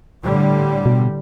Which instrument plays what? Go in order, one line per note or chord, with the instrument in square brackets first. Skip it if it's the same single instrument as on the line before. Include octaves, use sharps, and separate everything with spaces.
[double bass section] A2 D3 G3
[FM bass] B2